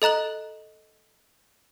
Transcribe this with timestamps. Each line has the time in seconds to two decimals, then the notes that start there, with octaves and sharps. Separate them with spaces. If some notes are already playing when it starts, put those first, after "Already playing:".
0.02 A4 D#5 A#5 F#6 F#7